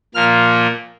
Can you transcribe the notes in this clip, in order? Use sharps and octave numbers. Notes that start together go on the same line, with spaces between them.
A#2 F3 A#3 F6